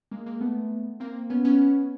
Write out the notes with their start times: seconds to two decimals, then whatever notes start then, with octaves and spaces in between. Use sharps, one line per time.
0.11 G#3 A#3
0.26 G#3 A#3
0.41 A3 B3
1.00 A#3 C4
1.30 B3 C#4
1.45 B3 C#4